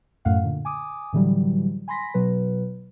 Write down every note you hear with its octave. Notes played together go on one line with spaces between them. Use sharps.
F#2 A2 A3 F5 F#5
A#2 D3
G#5 D6 D#6
A2 D3 E3 F#3 G3
G#5 B5 C6 A#6 B6
B2 F#3 B4